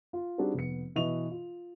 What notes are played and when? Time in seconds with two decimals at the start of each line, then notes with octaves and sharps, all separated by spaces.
0.13 F4
0.38 G3 C4 D4 D#4 F#4 G#4
0.54 F1 B3 C#7
0.95 B2 E3 D#5 C#6 F7
1.31 F4